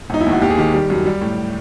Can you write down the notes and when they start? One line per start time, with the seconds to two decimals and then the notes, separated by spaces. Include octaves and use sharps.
0.10 E1 D#4
0.21 E4
0.26 D#2 F#4
0.41 D#2 G4
0.50 G#4
0.58 D#3 G4
0.74 G3
0.90 F#2
1.06 G3
1.21 A2